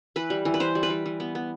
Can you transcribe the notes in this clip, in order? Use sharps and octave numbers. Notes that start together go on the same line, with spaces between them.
E3 B4
G3
E3
B4
E3 C5
G3
B4
G3
E3
B3
B3